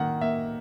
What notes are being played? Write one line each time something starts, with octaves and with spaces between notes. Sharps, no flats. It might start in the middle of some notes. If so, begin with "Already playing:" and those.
Already playing: D#3 A#3 F#5
A#3 E5